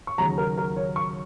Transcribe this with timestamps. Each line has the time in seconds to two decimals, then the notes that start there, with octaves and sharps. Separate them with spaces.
0.07 C#6
0.18 D#2 C#3 F#3 A#3 A#5
0.38 A#4
0.58 A#4
0.76 C#5
0.96 C#6